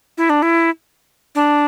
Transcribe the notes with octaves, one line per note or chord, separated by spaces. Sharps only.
E4
D4
E4
D4